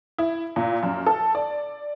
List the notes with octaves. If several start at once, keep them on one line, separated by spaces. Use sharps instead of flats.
E4
A#2
F#2
A4
D5